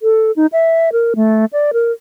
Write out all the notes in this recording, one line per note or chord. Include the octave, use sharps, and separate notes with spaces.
A4
D#4
E5
A#4
A3
D5
A#4